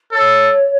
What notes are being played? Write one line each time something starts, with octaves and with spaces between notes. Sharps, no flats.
A4 C#5